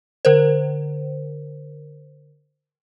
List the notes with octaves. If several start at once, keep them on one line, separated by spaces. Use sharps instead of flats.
D3 A#4 C5